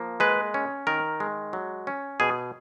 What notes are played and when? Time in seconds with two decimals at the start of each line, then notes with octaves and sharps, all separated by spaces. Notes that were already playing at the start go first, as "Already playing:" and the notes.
Already playing: F3 A#3
0.20 G#3 B4
0.54 C#4
0.87 D#3 A#4
1.20 G#3
1.53 F#3
1.87 C#4
2.20 B2 G#4